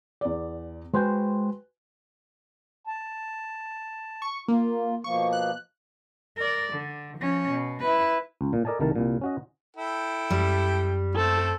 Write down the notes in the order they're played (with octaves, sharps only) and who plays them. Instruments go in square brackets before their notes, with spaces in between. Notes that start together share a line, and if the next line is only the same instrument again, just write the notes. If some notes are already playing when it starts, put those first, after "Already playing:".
[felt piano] E2 D5
[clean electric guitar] G#3 C5 G5 [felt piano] F#4 B4 G#5
[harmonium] A5
[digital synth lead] C#6
[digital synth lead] A#3 [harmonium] F4
[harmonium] B2 F3 A#3 [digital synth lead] C#6
[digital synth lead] F#6
[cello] A#4 D5
D3
F3 C#4
B2
E4 B4
[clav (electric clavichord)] C#2
A#2
A4 A#4 D5 D#5 G#5 A5
C2 D#3 A3 A#4 A5
C2 A#2
C#4 F#4 D#5
[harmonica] E4 A4 G5
[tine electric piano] F#2 [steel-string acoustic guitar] G3
[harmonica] A3 C4 [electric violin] A4